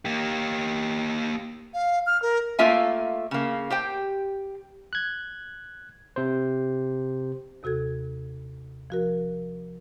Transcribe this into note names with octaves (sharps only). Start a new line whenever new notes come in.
A#3 G4
F5
F6
A#4
A3 A#3 F4 E5 G#5
C#3 A#3
G4 C5 G5
F#6 G#6
C3 C5
D#2 C3 F#4 A4 G#6
F3 F#4 A#4